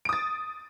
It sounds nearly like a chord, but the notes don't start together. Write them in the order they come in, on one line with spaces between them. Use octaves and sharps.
D7 D#6 A6